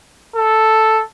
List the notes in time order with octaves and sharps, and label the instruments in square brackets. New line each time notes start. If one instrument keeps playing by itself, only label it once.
[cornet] A4